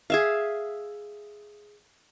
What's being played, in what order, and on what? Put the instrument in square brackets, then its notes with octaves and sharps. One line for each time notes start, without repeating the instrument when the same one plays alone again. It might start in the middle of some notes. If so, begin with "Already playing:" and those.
[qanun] G#4 E5 F5